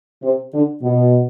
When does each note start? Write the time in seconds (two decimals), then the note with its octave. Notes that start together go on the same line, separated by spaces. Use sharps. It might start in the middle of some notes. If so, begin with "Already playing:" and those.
0.24 C3
0.54 D3
0.83 B2